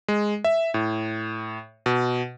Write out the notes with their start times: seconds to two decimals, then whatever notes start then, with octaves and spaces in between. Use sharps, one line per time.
0.08 G#3
0.44 E5
0.74 A2
1.86 B2